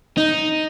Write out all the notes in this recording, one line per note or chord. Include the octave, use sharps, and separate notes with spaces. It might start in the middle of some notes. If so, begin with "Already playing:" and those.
D#4